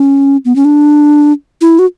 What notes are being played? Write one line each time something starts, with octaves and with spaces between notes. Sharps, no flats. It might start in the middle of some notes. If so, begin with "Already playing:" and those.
Already playing: C#4
B3
C#4
D4
E4
F#4